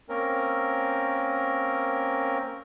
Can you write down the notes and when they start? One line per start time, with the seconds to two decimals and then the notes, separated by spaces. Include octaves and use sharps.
0.09 A#3 C4 C#4 A#4